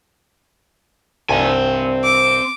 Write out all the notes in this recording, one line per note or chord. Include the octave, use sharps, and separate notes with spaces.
C2 G2 C4 G#5
D6